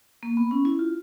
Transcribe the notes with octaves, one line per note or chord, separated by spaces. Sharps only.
A#3
B3
C#4
E4
F4